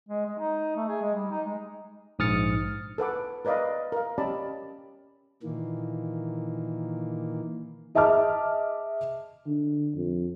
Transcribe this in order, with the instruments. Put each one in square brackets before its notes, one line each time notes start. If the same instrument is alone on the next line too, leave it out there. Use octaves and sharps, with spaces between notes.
[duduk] G#3
G#3
D#4
A3
G#4
G#3
G3
D#4
G#3
[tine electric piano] A#1 G#2 D#6 F6 A6 C#7
[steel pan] A4 B4 F#5 D6
A#4 B4 D5 D#5 F5
A#4 F5
C#4 G4 D5 D#5 A5 B5
[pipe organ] A#2 D#3 E3 A#3
[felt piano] G#4 D#5 E5 A5 D6 F6
[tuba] D3
F2